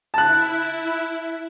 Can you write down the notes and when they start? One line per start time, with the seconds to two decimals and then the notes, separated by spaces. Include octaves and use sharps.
0.14 E4 A5 F#6